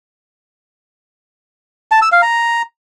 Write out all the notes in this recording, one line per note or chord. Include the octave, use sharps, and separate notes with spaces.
A5
E6
F5
A#5